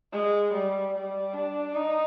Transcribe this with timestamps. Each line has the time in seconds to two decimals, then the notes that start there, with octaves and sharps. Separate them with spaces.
0.13 G#3
0.53 G3
0.94 G3
1.33 D4
1.75 D#4